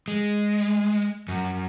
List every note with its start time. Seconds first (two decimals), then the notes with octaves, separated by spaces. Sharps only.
0.08 G#3
1.28 F#2